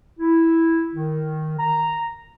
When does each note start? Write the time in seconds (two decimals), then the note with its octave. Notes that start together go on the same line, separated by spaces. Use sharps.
0.19 E4
0.95 D#3
1.59 A#5